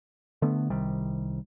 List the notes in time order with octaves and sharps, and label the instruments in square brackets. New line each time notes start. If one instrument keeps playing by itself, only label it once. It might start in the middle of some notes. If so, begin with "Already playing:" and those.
[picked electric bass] D3 A3 B3
C2 C3 D#3 G3